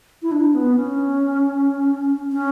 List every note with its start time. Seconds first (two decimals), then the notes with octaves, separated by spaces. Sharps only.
0.22 E4
0.32 D4
0.55 B3
0.76 C#4
2.32 C#4